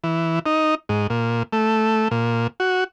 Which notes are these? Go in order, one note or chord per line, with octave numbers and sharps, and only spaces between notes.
E3
D#4
G#2
A#2
A3
A#2
F#4